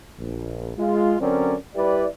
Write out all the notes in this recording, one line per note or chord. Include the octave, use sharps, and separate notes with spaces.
A#1
G#3 F4
D3 F#3 C4 C#4 A#4 D5
G3 E4 G4 B4 D5